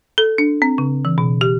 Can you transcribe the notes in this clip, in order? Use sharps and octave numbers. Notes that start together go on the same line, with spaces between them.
A4
D4
C4
C#3
E3
B2
G4